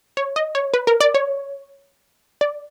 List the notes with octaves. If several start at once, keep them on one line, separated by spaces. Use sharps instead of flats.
C#5
D#5
C#5
B4
A#4
D5
C#5
D5